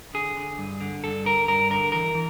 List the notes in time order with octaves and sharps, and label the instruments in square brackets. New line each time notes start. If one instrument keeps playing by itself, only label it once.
[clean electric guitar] D3 G#4
D3
G2
D3
G2 A4
D3 A#4
G2 A#4
D3 A#4
E3 A#4
E3